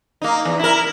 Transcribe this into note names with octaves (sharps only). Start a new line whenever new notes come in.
A#3 D#4
E2
E4 A#4